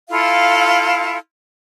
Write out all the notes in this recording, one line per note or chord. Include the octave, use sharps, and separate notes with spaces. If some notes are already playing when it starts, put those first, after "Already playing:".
E4 F4 A4 F5